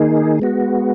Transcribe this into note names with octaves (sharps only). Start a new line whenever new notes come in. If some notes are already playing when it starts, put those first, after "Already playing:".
Already playing: D#3 A#3 D#4 G#4
G#3 B3 F#4